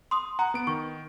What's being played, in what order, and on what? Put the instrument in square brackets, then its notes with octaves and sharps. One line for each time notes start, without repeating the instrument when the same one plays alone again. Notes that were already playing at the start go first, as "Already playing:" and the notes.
[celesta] C6 D#6
[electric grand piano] F#5 [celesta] A#5
[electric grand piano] B3 D7
[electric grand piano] D#3 [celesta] C#6